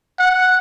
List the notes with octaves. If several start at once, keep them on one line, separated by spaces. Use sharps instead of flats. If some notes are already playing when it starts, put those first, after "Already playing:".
F#5